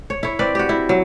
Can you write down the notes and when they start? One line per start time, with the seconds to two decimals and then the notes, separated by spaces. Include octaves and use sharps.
0.10 C#5
0.23 E4 C#5
0.39 C4 B4 D5
0.55 F#4 G4
0.69 E4
0.89 F#3